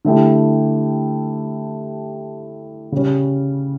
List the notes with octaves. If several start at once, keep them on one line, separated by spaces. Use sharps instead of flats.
D3 A3 E4 G4
C#3 G3 C#4